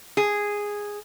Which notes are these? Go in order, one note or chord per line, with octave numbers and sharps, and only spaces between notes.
G#4